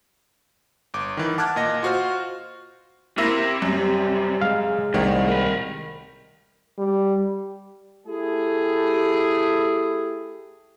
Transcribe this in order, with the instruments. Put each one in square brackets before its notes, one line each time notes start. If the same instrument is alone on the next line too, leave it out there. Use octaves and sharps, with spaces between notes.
[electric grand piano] G1 D6
D#3 E3
F#5 A5 D6 F6 F#6 G#6
A#2 D#5 A#6
F4 F#4 C5 F6
[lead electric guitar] C3 [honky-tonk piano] A#3 E4 A#6
[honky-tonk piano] F#2 [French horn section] G3
[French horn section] G#3 [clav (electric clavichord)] F5
[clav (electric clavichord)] C2 [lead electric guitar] A2 A3 [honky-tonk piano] D#3
[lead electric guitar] A#4 B5
[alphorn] G3
[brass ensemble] A3 E4 G4 G#4